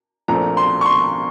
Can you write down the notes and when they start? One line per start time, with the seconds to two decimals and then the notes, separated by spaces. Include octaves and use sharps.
0.28 A#1 A#2 A3 C4 A#5
0.57 C6
0.81 C#6
0.86 C6